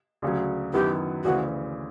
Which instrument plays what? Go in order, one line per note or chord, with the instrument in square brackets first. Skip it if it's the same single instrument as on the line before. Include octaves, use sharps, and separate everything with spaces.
[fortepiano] D2 C#3 F#3
[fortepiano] F#2 D#3 F#3 B3 E4 [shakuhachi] G4
[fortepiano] D2 C#3 E3 [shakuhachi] F#4